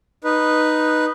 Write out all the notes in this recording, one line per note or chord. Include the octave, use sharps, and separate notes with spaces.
D#4 B4